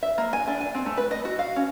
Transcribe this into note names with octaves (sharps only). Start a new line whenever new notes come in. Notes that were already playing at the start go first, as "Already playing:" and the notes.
E5
A#3
G#5
D4
G#5
C4
A3
B4
D#5
F#4
F5
C#4